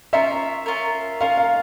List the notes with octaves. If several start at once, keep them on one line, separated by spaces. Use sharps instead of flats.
C#4 F4 A#4 E5
C#4 F4 A#4
C#4 F4 A#4 F5
F5